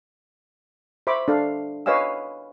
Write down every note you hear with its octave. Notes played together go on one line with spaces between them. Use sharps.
C5 E5 B5 C#6 D6
D4 A4 F5
B4 C#5 D#5 F5 G#5 E6